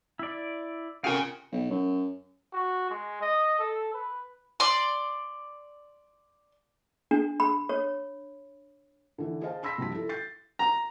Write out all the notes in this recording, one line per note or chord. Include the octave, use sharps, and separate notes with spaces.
E4 D5
C#3 F4 F#4 G#4 A#4 F5 G5 G#5
B1
F#2
F#4
G#3
D#5
A4
B4
D5 C6
D4
B5
C#5
D3 E3
G#4 C5 D#5 F5 A5
B5 C6 E6 A#6 B6
C2 G2 F3 G4 B6
E4 A4
G6 A6 C7
A#5